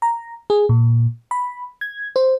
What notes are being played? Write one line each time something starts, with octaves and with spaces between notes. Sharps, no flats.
A#5
G#4
A#2
B5
G#6
C5